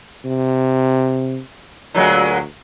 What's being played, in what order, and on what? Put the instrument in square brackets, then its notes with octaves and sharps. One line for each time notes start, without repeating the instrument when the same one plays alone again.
[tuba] C3
[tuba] D2 [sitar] A#2 F#3 G#3